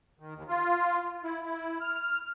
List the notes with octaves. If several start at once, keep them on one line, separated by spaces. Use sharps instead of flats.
D#3
D#2
F4
E4
E4
F6